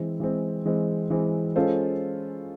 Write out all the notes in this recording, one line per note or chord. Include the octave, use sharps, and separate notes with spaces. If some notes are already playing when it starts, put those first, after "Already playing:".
Already playing: E3 G#3 C4
E3 G#3 C4
E3 G#3 C4
E3 G#3 C4
G#3 C#4 F4 A4 C5